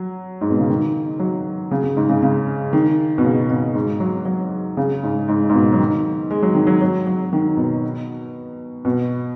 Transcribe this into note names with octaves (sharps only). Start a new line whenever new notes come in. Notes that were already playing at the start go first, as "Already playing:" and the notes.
Already playing: F#3
G#2
B2
C#3
D#3
F#3
C#3
C#3
G#2
C#3
C#3
D#3
B2
C#3
B2
G#2
F#3
F#3
C#3
G#2
G#2
G#2
B2
F#3
D#3
G#3
F#3
D#3
F#3
F#3
F#3
D#3
B2
B2